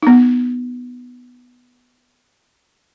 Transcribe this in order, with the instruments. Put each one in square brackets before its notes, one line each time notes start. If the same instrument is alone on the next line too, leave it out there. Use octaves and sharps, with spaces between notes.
[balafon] B3 D#4